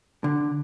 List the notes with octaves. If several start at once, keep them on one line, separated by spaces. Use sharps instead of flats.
D3